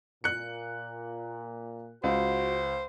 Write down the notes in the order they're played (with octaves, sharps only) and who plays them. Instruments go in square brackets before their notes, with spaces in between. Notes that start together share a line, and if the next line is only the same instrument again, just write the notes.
[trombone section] A#2 [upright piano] F#6 C#7
[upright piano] C#2 [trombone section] F#4 [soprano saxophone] C5